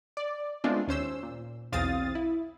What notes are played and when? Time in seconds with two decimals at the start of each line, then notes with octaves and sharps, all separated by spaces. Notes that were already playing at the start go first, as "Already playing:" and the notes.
0.17 D5
0.64 G#3 A3 B3 C4 D4 F4
0.87 D#2 C#4 C5 E6
1.23 A#2
1.72 B1 E2 C4 F5 D#6 A6
2.15 E4